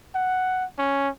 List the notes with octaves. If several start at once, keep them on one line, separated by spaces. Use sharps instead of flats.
F#5
C#4